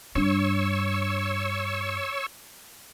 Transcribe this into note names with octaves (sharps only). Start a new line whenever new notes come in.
G2 D4 C#5 C#6 E6